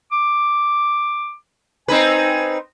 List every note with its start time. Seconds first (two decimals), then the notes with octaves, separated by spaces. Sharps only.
0.12 D6
1.88 C4 D#4 B4 G#5